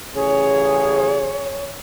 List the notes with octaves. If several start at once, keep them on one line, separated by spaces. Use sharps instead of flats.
A1 C#3 G#4 C#5